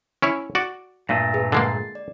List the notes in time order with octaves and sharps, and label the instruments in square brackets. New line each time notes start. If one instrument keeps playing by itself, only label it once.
[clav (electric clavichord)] C#4 E4 C#5
F#4 D5
[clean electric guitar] G2 A#2 A3 [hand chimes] A#6
[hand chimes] G#4 B4
[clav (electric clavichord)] D3 G#3 A#3 [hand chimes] A6 C7
[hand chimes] D5